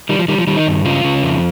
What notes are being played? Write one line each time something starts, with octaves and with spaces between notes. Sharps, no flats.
D#3 G3
F3
D#3 G3
F3
D#3 G3
D#4
G2
C#3 F4
C#3
F2